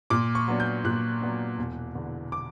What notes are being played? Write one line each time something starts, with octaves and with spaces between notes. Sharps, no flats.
A#2 D6
C#6
F#3 B3 D4
G6
A#2 F#6
F#3 B3 D4
E1
E2 D3
D6